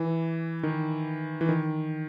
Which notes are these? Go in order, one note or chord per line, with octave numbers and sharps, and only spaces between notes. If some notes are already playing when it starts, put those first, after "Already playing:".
Already playing: E3
D#3
E3
D#3